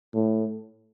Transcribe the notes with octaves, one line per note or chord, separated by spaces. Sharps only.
A2